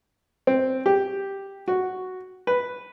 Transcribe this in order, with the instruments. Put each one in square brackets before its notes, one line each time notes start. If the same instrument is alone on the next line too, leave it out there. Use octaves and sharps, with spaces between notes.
[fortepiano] C4
G4
F#4
B4